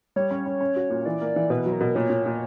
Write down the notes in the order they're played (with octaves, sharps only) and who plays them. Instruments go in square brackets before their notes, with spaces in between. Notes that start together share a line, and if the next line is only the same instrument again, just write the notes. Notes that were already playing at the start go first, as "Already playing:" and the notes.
[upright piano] G3 [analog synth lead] C#5
[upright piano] C#4
C#4
C#4
F#4
A#2
[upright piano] E3 [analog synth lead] D5
[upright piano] A#3
E3
[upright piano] B2 [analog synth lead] B4
[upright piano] F#3
[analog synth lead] A#4
[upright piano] B2
[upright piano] A#2 [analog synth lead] C#5
[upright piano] A#2
A#2